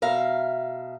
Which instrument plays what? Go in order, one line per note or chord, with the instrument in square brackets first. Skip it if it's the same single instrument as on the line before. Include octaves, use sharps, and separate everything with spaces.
[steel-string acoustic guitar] B2 E5 F5 A#5